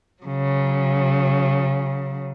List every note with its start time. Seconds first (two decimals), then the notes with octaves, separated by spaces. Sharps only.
0.23 C#3 F#3